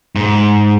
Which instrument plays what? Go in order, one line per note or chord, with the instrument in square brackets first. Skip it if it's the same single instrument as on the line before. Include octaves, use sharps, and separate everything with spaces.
[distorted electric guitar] G#2